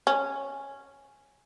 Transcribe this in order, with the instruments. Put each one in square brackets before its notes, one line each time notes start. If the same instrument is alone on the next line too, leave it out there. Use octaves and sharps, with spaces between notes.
[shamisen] C#4